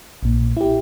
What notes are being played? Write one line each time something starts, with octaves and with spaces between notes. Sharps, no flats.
A#1 A#2
E4 G4